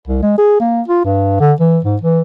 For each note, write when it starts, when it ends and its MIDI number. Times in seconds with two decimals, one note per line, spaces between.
0.08 0.21 36
0.22 0.37 56
0.38 0.58 68
0.60 0.82 58
0.88 1.02 65
1.05 1.39 43
1.40 1.53 50
1.60 1.79 52
1.84 1.96 44
2.01 2.21 52